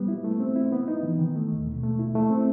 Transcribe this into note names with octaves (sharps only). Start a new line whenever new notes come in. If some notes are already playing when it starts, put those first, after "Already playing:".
Already playing: G3 B3
E4
A3
C4
E4
B3
D#4
E3
D#3
A3
D#2
B2
A3
E4
A3
C4